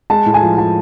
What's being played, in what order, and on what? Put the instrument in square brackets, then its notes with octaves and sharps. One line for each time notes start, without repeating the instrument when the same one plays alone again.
[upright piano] G#3 [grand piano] A5
[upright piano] A2
[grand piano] G#5
[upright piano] F3
[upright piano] F3 [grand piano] A5